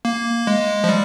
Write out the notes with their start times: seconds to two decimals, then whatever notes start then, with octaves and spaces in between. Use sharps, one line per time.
0.05 A#3
0.47 G#3
0.84 F3
0.89 G3